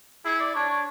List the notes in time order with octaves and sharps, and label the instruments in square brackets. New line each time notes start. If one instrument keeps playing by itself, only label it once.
[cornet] E4 [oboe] G#4
[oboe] D5
[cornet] D4 [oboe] C#5
[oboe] C#5